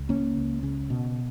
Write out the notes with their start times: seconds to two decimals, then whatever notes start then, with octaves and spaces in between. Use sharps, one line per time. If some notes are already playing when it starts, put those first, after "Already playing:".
Already playing: C#2
0.09 C#3 A#3 C#4
0.37 C#2
0.63 C#3
0.90 B2